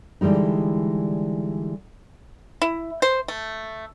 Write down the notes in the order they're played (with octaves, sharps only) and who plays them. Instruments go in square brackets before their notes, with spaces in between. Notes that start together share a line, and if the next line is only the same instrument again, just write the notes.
[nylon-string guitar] D3 E3 G3 G#3 D#4
[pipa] E4
C5
A3